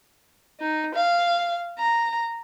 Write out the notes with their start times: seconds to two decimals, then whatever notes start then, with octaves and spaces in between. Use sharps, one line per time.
0.61 D#4
0.95 F5
1.79 A#5